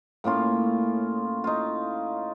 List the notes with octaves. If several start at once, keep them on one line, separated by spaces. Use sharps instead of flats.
A2 A#3 C#4 F4
D#4 F4